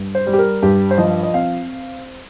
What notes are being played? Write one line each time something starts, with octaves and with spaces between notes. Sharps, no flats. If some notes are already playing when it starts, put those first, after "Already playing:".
Already playing: G2
C5
G3
G4
A#4
G2 G4
C5
F3 D#5
D#5
C4 F5